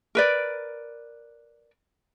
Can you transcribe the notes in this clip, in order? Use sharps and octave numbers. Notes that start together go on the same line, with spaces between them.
A#4 B4 D5